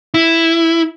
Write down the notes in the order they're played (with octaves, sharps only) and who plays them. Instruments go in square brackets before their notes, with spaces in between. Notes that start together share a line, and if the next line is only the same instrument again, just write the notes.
[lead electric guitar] E4